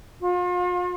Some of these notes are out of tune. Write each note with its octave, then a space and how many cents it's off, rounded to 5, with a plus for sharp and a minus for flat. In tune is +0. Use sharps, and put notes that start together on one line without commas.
F4 +40